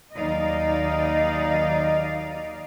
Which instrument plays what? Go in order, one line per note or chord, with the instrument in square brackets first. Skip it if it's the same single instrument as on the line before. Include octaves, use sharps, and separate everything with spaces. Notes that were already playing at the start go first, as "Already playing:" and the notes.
[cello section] D#2 F#3 D#4 D5 D#5 F5